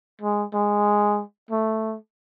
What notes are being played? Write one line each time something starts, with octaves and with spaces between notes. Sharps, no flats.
G#3
G#3
A3